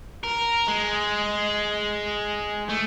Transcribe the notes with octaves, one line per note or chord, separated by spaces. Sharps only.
A#4
G#3
A3